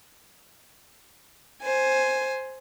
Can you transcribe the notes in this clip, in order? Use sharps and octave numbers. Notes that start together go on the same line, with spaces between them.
C5 G#5